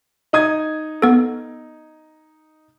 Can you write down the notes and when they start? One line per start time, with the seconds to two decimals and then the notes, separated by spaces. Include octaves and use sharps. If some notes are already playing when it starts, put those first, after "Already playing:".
0.33 D#4 D#6 G#6
1.02 B3 A4